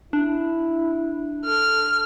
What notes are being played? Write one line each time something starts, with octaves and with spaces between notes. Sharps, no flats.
D4 E4
A4 F6